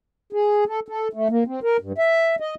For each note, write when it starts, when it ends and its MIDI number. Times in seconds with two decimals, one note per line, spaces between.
0.33 0.64 68
0.67 0.80 69
0.89 1.08 69
1.13 1.28 57
1.30 1.44 58
1.47 1.60 60
1.63 1.77 70
1.80 1.93 43
1.98 2.36 76
2.40 2.55 75